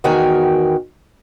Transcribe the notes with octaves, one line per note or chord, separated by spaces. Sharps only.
E2 D#3 F#4 A#4 G5 G#5